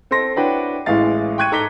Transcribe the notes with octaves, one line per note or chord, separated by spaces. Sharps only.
C4 A4 C6 A#6
D4 E4 F#4 B4 C#5 G5
A1 A2 E3 G#3 F5 A6
G5 C#6 F#6 G#6 D#7
G#2 A4 A#5 D6 B6 G7